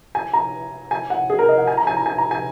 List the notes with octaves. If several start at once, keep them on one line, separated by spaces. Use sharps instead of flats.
G#5
A#5
G#5
F#5
G#4
A#4
D#5
F#5
G#5
A#5
G#5
A#5
G#5
A#5
G#5